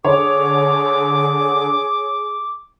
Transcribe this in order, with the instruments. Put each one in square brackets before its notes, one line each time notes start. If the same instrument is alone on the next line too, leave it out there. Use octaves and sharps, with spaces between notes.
[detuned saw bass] D3 [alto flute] G#4 [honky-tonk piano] C#5 [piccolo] D6